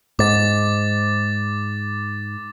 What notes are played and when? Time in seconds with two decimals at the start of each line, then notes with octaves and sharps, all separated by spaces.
0.19 G#2 D6 A6